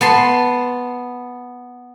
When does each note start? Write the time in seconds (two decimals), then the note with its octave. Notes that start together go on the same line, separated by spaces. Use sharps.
0.01 B3 A5 C6